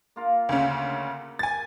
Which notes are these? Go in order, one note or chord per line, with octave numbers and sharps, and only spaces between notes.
A#3 F4 A#4
D2 C#3 A#3
G#5 A6